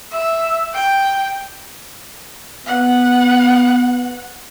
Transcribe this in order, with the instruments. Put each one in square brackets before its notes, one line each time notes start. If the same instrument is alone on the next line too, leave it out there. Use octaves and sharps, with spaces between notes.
[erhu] E5
G5
[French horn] B3 [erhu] F#5